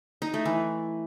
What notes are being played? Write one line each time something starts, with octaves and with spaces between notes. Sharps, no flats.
D#4
A3
E3